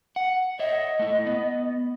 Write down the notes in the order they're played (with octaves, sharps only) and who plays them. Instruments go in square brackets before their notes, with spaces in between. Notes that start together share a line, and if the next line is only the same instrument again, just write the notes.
[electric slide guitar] F#5
[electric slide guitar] C#5 E5 [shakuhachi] D#5
[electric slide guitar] A3 E4
B3